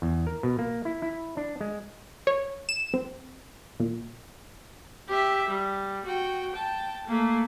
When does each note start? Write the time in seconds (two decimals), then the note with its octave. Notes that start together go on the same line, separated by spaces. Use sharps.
0.02 E2
0.27 A#4
0.43 B2
0.59 A#3
0.85 E4
1.02 E4
1.37 D4
1.61 G#3
2.27 C#5
2.69 E7
2.94 C4
3.80 A#2
5.09 G4 E5
5.49 G3
6.05 F#4 G5
6.51 G5 A5
7.07 A3 A#3